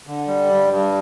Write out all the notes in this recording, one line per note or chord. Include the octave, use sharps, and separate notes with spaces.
D3
G3
G2
G2